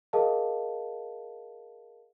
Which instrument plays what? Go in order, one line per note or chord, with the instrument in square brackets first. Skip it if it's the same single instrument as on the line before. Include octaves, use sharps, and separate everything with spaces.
[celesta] G#4 A#4 D#5 F5 A5